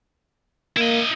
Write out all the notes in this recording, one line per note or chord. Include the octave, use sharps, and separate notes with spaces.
A#3 E4 D#5